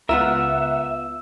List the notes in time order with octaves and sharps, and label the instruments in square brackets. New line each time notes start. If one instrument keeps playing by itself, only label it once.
[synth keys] C#2 F#5 [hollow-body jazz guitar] B3 F4 A#4 [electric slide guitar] E5 [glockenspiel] E6